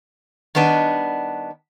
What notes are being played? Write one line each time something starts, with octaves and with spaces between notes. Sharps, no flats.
D#3 G3 B3 D4 D#5